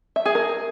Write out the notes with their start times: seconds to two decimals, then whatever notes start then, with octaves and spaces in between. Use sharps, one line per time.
0.16 E5
0.26 G#4
0.35 A#4